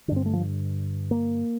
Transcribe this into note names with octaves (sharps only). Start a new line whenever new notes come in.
G2 D3 C4 D4
A3
F3
A#3